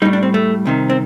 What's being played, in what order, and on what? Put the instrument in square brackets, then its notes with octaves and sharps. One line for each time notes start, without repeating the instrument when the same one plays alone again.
[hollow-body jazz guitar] G3 D#4
A2
D4
C4
A3
C2 C3 D#3
C4